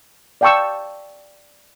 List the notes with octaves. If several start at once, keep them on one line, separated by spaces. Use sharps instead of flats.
D5 F5 G5 A5 C#6 E6